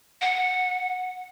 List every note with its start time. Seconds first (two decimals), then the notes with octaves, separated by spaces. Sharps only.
0.21 F#5